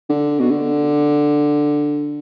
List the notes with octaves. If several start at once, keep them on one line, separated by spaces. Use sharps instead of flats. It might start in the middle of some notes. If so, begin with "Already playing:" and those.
D3
B2
D3